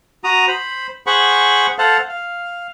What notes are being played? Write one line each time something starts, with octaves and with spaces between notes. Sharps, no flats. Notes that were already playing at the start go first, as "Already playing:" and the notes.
F#4 A#5 D#6
C5 B5
G#4 C5 F#5 B5 C#6
A4 C5 F5 F#5 A5
F5